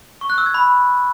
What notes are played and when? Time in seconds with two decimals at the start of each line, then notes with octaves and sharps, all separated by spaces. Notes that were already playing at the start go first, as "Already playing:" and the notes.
0.21 C#6
0.30 F#6
0.38 E6
0.46 G#6
0.54 B5